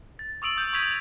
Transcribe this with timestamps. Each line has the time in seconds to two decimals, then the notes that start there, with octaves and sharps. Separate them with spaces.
0.19 A6
0.42 C#6 D#6 E6 D7 F#7
0.57 D#6 G6
0.73 C#6 G6 G#6 B6 F7 F#7